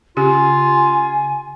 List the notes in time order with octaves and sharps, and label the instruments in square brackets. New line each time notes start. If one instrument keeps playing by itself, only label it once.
[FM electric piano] C#3 [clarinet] F4 [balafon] G4 [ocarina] G#5